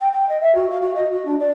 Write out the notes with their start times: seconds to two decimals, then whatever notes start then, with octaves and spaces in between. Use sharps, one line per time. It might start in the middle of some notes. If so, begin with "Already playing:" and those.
0.01 G5
0.13 G5
0.29 D#5
0.41 E5
0.55 F#4
0.70 F5
0.82 F#4
0.95 D#5
1.12 F#4
1.26 D4
1.40 D5